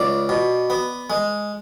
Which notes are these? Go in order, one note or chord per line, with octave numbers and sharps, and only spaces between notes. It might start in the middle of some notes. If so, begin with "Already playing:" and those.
Already playing: C#2 D5
B2
B3
G#3